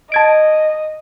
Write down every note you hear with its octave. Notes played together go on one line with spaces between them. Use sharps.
D#5 A5 G#6 D7